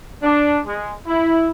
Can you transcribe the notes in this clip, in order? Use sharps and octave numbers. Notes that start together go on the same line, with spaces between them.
D4
G#3
E4